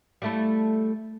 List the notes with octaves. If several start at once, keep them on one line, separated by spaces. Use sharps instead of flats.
G3 A3 E4